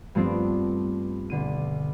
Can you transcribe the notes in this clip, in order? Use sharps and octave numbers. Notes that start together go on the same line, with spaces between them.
G2 F3 A3 B3 C4 D4
B1 D3 D#7